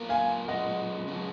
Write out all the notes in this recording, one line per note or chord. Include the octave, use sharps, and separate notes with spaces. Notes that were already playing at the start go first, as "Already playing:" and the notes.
Already playing: F#3 A#3 F4 A#4
F5 G#5
F#3 C#4 F4 G#4 D#5 F#5
F#3 C#4 F4 G#4